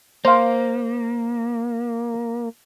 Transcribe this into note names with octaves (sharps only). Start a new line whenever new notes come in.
A#3 C5 F5